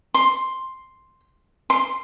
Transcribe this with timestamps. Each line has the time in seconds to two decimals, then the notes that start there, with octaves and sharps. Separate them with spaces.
0.14 C6
1.70 C6